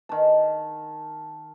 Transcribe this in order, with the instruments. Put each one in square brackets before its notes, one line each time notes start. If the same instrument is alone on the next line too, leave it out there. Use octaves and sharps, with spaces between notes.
[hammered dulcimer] D#3 A5